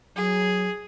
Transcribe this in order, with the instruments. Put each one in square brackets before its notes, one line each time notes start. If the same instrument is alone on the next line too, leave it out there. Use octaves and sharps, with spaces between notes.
[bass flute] F#3 [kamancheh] G#4